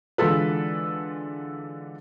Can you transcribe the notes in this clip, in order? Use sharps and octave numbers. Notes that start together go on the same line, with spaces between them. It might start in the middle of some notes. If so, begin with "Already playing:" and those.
D3 E3 G#3 F4 A4 B4